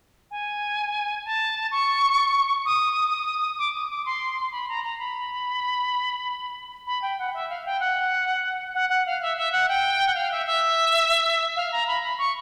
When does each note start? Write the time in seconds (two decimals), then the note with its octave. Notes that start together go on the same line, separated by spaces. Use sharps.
0.30 G#5
1.24 A5
1.71 C#6
2.65 D#6
3.58 D6
3.74 D#6
3.90 D6
4.05 C6
4.51 B5
4.68 A#5
4.83 A#5
4.99 B5
6.86 B5
7.01 G5
7.18 F#5
7.33 E5
7.49 F5
7.65 G5
7.80 F#5
8.74 F#5
8.89 F#5
9.06 F5
9.21 E5
9.37 E5
9.52 F#5
9.68 G5
10.07 F#5
10.14 F5
10.31 E5
10.45 E5
11.56 F5
11.71 A#5
11.87 B5
12.02 B5
12.18 C#6